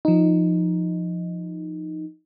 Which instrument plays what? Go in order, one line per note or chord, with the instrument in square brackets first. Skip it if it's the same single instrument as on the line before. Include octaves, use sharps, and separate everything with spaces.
[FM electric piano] F3 D#4